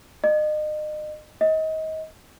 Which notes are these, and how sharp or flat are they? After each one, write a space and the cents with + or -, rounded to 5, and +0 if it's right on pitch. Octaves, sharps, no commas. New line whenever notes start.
D#5 -35
D#5 +25